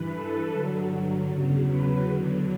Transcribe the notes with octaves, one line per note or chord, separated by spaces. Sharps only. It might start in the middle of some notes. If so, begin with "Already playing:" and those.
Already playing: G2 E3 B4
A4
G2 D3 F#3
E2 C#3 F#3
B4
E2 D3 F#3